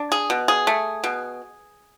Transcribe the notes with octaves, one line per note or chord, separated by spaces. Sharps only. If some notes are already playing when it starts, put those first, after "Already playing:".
Already playing: D4
G#4
B2
G#4
A3
B2